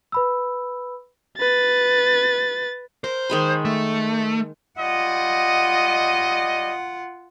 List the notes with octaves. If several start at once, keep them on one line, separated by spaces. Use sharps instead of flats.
B4 B5 E6
B4 A6
A#4 C5
D#3 G#3 B5
A3
G3 F4 D#5 F#5